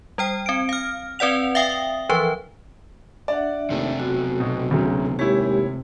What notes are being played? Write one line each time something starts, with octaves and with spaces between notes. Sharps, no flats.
G3 C5 G5
C4 D7
F5 F6
C4 B4 D5 F#5 F7
E5 F5 G5 D#6
E3 F3 B4
D4 D5 E5 F#5
D#2 C3 A3
B1 F#4
B2
D2 C#3 F#3
D#2 G#3 E4 G4 C#5